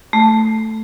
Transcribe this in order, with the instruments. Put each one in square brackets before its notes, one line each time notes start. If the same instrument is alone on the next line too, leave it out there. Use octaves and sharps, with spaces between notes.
[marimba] A3